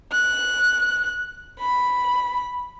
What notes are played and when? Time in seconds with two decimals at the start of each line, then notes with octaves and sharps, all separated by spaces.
0.12 F#6
1.59 B5